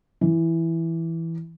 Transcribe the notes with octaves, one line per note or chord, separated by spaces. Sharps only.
E3